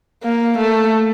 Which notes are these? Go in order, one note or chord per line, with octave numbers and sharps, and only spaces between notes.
A#3
A3